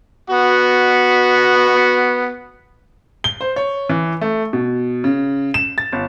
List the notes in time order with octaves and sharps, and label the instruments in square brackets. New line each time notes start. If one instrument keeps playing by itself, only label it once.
[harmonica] B3 F#4
[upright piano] G7
C5
C#5
E3
A3
B2
C#3
E7
A6
G1